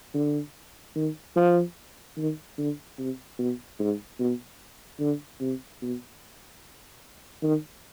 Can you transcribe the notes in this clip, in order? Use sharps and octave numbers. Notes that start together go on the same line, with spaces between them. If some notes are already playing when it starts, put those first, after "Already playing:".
D3
D#3
F3
D#3
D3
C3
B2
G#2
B2
D3
C3
B2
D#3